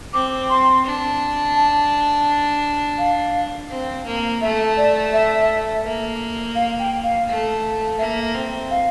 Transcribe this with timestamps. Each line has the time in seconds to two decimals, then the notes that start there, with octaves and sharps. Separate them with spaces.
0.13 C4 D6
0.49 C6
0.85 D4
1.56 A5
2.98 F5
3.70 C4
4.06 A#3
4.41 A3 E5
4.77 D5
5.13 E5
5.85 A#3
6.55 F5
6.80 G5
7.04 F5
7.28 A3
7.99 A#3 E5
8.35 C4
8.71 F5